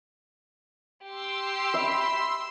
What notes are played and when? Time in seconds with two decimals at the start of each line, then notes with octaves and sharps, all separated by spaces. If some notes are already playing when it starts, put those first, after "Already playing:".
1.04 G4 C6 E6
1.74 E5 B5